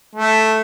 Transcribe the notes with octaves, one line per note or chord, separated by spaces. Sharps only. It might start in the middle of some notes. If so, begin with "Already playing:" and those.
A3